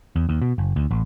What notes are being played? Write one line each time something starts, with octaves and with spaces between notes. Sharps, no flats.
E2
D#2
B2
F#1
D2
A1